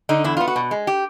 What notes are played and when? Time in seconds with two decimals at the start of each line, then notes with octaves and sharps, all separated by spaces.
0.09 D3 D#4
0.24 E2 E4
0.37 B3 F4
0.47 F#4
0.56 B2
0.71 G#3
0.87 G4